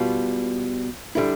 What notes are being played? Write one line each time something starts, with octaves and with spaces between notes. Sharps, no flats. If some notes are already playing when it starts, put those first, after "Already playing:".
Already playing: B2 G3 F4
D3 G3 E4